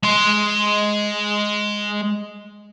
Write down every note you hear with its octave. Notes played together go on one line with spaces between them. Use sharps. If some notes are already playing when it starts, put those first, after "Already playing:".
G#3 C6